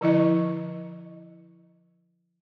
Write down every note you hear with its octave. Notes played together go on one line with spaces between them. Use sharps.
D3 F3 E4 D#5